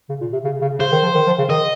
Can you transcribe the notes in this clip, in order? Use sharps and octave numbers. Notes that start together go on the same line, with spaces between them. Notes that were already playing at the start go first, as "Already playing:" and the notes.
C#3
A#2
C3
C#3
C#3
C#3 C5
D#3
F3
D#3
F3
C#3
D#3 D#5